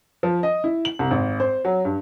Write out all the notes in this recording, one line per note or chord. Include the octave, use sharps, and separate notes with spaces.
F3
D#5
E4
F#7
C2
G#1
C5
F#3
G2